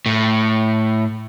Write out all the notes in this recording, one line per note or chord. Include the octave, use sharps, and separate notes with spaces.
A2